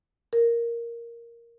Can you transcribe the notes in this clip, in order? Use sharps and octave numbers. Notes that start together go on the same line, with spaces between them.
A#4